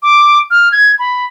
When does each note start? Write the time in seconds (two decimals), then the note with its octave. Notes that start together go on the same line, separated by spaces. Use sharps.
0.03 D6
0.51 F6
0.72 G#6
0.99 B5